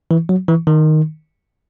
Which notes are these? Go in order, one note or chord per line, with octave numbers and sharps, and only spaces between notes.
E3
F#3
E3
D#3